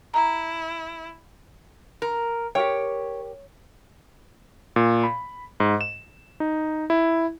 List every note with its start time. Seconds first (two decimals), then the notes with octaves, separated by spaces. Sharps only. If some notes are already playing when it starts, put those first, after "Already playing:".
0.14 E4 A#5
2.02 A#4
2.55 G4 A#4 C#5 G5
4.76 A#2
5.04 B5
5.60 G#2
5.81 E7
6.40 D#4
6.90 E4